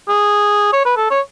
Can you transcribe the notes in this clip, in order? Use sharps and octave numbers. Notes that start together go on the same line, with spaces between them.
G#4
C#5
B4
A4
C#5